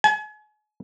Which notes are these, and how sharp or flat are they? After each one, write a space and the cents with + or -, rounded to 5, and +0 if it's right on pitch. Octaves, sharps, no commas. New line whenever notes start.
G#5 +40